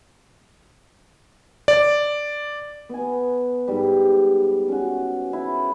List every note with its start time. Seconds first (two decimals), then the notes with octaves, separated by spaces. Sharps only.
1.68 D5
2.89 B3 G#5
3.68 G#2 G3
4.69 C#4 F#4
5.33 E4